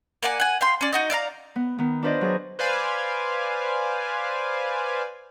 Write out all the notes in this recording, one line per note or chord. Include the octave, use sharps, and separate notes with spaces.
A#3 D5 F#5 G#5
F#5 G#5
F5 G5 C6
C#4 D5
D#4 F#4 D#5
D5 E5 F5 A#5
B3
D#3 B3
D4 F4 B4 C5 D5 D#5
F#3 G#4 D#5
B4 C5 D5 F5 G#5